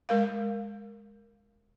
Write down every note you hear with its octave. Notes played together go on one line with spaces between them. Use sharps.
G#3 A#4 F5